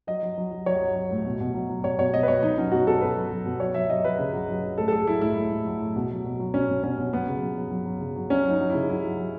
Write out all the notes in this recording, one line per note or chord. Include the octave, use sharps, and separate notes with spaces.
F#3 D#5
F#3
F#3
F#3
F#3 C#5
F#3
F#3
A2
B2
B2
F#3
F#3
B2 C#5
B2 C#5
B2 D#5
B4
B2 C#5
F#3 D#4
F#3 C#4
B2 F#4
B2 A4
B2 B4
F#3
F#3
B2
F#3 C#5
F#3 E5
F#3 D#5
F#3 B4
C#3
F#3
F#3
F#3
A2 A4
A4
A2 G#4
F#3 E4
A2 E4
A2
A2
F#3
A2
B2
F#3
B2
F#3
B2 C#4
B2
B2 C#4
B2
F#3 B3
C#3
F#3
F#3
F#3
F#3
C#3
F#3
F#3 C#4
F#3
D#4
F#3
C#3 E4
F#3 E4
F#3
F#3